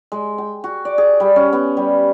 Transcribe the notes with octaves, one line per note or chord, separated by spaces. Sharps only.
G#3
G5
F#4
D5
G#4
G3
C#4
B3
G3